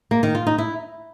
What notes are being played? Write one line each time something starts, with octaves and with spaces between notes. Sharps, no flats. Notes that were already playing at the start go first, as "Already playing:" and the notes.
A#3
D#3
F4
D#4
E4